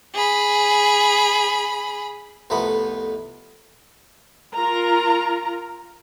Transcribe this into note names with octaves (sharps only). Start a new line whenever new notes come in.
G#4 B5
C2 F2 A3 B3 B5
F4 A#4 A#5